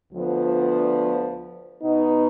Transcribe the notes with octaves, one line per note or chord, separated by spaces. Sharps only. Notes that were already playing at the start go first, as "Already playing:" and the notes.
D2 D3 F3 B3
B2 B3 D#4